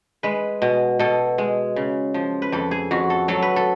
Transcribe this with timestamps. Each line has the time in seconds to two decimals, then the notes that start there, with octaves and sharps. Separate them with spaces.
0.23 G#3 B4
0.62 B2
0.99 B2 A4
1.38 G#3
1.76 C#3
2.14 F3
2.42 B4
2.52 F2 A4
2.71 G#4
2.91 F2 F#4
3.10 A4
3.28 F#3 A4
3.42 B4
3.56 A4